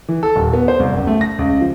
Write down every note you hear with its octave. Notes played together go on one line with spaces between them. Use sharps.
E3
A4
D#1
B3
C5
C2
F#1
A3
A#6
C#2
F3